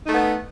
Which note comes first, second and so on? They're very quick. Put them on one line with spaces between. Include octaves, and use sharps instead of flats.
D#4 A3 B3